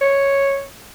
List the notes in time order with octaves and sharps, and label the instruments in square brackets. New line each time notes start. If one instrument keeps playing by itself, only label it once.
[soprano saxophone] C#5